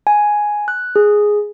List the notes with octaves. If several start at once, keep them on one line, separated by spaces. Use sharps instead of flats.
G#5
F#6
G#4